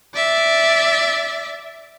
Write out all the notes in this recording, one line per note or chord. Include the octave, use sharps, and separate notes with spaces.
D5 E5